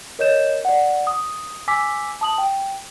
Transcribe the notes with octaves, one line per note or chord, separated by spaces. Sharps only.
A#4 C#5 D#5 G6 E7
D5 F#5
D#6
G#5 D6 E6 B6
A5 D#6 F#7
G5